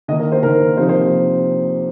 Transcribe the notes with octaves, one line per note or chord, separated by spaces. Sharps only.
D#3 A#3 D#4 D#5
A#4
C5
D#3 A#3 D#4 A#4
C3 F3 A#3 D#4 C5
C5